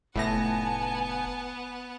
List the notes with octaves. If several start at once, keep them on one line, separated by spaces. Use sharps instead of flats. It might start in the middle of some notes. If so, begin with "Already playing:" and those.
F1 A2 A3 B3 F#5 G#5 A5 A#6